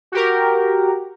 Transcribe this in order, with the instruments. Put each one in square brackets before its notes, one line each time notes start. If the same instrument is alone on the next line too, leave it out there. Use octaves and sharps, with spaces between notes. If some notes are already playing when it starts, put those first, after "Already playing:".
[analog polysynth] F#4 G4 A#4